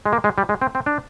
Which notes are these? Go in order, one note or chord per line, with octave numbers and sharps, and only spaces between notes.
G#3
A#3
G#3
G3
G#3
C4
C4
D4